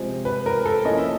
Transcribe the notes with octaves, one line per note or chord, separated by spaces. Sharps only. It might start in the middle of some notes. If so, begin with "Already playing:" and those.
Already playing: C3 F3 G#3 C4
B4
A#4
A4
F3 A#3 C#4 E4 D#5
E5